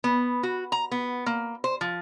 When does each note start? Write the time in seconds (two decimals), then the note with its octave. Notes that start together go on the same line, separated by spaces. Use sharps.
0.04 B3
0.43 F#4
0.72 A#5
0.92 B3
1.26 A#3
1.64 C5
1.81 F3